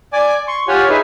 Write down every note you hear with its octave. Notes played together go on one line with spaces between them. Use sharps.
D5 G#5 D6
C6 C#6
F4 G4 C#5 F#5 G#5
D#4 G#4 B4 E5